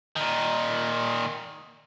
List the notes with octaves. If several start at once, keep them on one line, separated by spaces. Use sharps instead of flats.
A#2 D#3